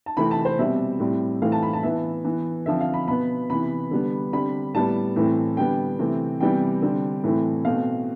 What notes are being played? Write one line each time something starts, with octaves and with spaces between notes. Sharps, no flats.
A5
C3 E3 A3 C4 B5
A5
C5
B2 G3 C4 E5
A2 G3 C4
A2 E3 A3 C4 F5
A5
B5
A5
E3 B3 E5
E3 B3
D3 F3 C4 E5
F5
B5
B2 B3 B5
C3 E3 B3 B5
D3 G3 B3
D3 G3 C4 B5
A2 G3 B3 A5
A2 E3 A3 C4
D3 G3 B3 G5
C3 E3 A3 C4
C3 E3 G3 B3 G5
D3 G3 C4
A2 E3 A3 C4
B2 A3 C4 F5